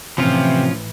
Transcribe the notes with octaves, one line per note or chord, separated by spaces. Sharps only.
A2 C3 E3 F3 C#4 F4